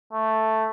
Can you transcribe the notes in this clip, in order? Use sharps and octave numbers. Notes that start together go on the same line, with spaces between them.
A3